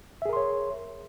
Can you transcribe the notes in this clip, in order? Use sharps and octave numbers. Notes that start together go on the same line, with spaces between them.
G#4 A#4 C#5 E5 C6